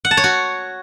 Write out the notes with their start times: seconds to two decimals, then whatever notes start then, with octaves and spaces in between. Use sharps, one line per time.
0.05 F#5
0.11 A5
0.17 C#5
0.24 F#4